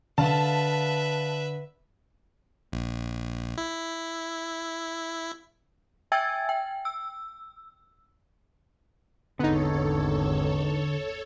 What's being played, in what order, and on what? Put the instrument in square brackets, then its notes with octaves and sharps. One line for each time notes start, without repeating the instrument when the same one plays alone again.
[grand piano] D3 [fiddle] B4 E5 [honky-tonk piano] F5 A5
[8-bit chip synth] A#1
E4
[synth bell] E5 G5 G#5 E6 G#6 A6
G5
E6
[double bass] G#1 E2 [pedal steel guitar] D3 [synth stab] B3 D#4 [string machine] A4 C#5